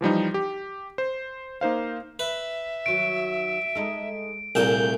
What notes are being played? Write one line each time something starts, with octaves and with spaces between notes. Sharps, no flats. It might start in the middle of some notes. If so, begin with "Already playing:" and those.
E3 F3 G3 D#4
G4
C5
A#3 D#4 C5 F5
B4 E5
D#3 F#3 D7
G#3 D#4 A4
C2 A#2 A3 G#4 A#4 A5 G6